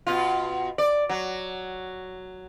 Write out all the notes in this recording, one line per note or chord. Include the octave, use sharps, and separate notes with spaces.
B2 F4
D5
F#3